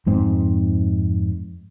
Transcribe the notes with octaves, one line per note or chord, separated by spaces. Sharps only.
F2 G#2 C4